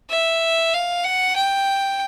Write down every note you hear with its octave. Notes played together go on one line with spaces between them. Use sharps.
E5
F5
F#5
G5